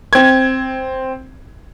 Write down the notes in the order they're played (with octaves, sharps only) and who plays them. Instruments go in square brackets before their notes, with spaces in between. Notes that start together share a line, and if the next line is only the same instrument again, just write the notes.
[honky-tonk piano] C4 G#6